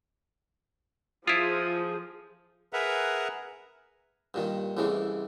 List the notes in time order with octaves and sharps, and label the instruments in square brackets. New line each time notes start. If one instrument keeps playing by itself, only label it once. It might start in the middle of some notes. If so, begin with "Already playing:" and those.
[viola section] F3 G#4 [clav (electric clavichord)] E4 F4 [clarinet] D#6
[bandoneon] G#4 A#4 B4 E5 F#5 A#5
[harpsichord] G2 A#2 D#3
C2 A2 C#3 E3 G#3